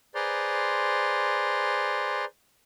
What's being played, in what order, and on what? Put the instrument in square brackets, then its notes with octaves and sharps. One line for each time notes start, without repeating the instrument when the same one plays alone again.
[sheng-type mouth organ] G#4 B4 C5 D5 A#5 C6